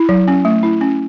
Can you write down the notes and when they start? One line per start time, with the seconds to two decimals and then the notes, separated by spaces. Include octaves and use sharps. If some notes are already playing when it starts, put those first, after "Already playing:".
Already playing: E4
0.09 F#3
0.28 C#4
0.45 A3
0.63 E4
0.81 C#4